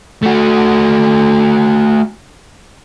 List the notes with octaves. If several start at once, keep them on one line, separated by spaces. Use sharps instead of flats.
A3 F#4